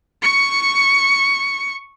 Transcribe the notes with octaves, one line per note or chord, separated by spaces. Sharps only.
C#6 C#7